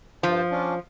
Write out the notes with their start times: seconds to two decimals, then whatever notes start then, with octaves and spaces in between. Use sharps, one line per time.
0.23 G2 F3 C5 A5
0.51 C#4 D4 F4